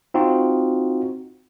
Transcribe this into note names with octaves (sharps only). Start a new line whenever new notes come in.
C4 D#4 F4 F#4